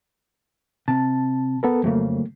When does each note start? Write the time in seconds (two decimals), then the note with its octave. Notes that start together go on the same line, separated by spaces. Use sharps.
0.88 C3 A5
1.63 B3 A4 A#4
1.84 F2 C#3 F#3 A3 A#3